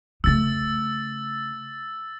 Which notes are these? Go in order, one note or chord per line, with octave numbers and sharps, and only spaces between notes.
C#3 A3 E6 A6